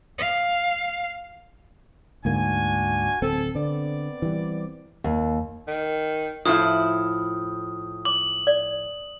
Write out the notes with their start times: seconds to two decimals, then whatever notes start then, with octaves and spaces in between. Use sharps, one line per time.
0.18 F5
2.25 D2 G#2 A#3 D4 F#4 G#5
3.22 D1 C4 A4
3.55 D3 B3 C4 D5
4.22 E3 G3
5.04 D#2
5.68 D#3
6.45 A2 F3 E4 F4 D#6
8.05 D6 F#7
8.47 D5